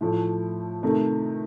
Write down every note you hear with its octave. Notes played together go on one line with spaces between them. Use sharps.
A2 F3 A3
C3 D#3 A3 D#4